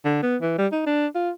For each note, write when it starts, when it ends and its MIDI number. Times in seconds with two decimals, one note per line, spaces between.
0.05 0.21 50
0.23 0.36 59
0.42 0.54 52
0.58 0.67 55
0.72 0.85 63
0.87 1.07 62
1.15 1.31 65